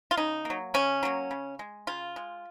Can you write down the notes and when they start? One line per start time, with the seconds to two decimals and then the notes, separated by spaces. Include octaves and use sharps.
0.11 F4
0.17 C#3 D#4
0.45 F#3 A#3
0.74 C#3 C#4
1.03 F#3 A#3
1.31 C#3
1.59 G#3
1.87 C#3 F4
2.16 G#3